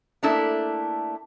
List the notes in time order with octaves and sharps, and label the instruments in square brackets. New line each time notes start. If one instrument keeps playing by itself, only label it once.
[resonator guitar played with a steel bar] A3 A#3 D4 E4 A4